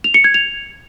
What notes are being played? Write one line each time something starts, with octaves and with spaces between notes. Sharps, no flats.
F7
C#7
G#6
F7